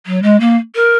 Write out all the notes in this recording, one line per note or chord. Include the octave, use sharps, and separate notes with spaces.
F#3
G#3
A#3
A#4